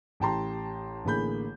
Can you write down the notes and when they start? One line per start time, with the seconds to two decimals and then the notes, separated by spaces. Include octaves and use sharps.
0.20 A1 G4 G5 A5 A#5 C6
1.05 A1 D3 A#3 G#4 B5 G6